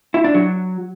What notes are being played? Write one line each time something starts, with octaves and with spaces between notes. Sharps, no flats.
E4
D4
F#3